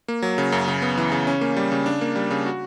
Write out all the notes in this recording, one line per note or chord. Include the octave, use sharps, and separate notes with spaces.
A#3
F#3
C#3
F#2
C#3
B3
E3
C#3
C#4
A#3
G3
C#3
D4
A#3
G3
C#3
F#4